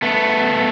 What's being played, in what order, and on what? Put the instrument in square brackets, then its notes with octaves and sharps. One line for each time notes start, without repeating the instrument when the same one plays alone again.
[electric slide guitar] A3 B3